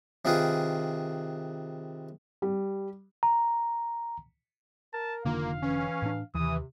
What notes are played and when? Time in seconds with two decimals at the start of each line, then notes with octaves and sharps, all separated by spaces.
0.25 C3 D#3 F4 G#4 B4
2.42 G3
3.23 A#5
4.94 A#4 A5
5.25 F1 D3 D#3 A#3 F4 F5
5.62 E3 C#4
6.02 A2 D4
6.35 D#2 C3 E3 D#6